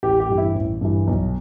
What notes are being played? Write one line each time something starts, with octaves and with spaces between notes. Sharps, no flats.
A1 G4
G4
G2 E3
E4
A1
G2 E3
B1